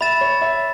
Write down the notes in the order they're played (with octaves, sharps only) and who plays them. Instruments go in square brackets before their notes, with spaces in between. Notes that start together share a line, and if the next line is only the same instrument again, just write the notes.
[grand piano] E5 [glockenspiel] B5 A6 E7
[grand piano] C#5
E5